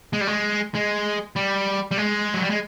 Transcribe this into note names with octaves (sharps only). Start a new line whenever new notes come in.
G#3
G3
G#3
G#3
G3
G3
G#3
F#3
G3
G#3